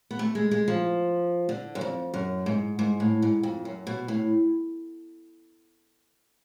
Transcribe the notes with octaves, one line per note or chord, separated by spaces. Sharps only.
B3
A3
G#3
G#3
F3
D3
F#2
F2
F#2
G#2
G#2
A2
G#2
F2
F#2
B2
A2